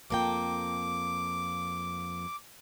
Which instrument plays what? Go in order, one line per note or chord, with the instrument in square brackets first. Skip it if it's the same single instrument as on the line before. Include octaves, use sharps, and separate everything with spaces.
[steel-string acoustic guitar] F2 A#3 G5 [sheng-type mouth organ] D6